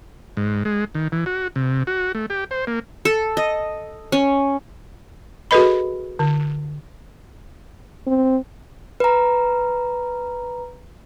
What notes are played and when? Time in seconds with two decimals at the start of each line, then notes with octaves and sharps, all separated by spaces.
0.37 G#2
0.65 G#3
0.95 D#3
1.12 E3
1.26 F#4
1.56 C3
1.87 F#4
2.15 A3
2.30 G4
2.51 C5
2.67 A#3
3.05 A4
3.37 D#5
4.12 C#4
5.51 F#4 G#4 A4 B4 D#5 B5
6.19 D3
8.07 C4
9.00 B4 A#5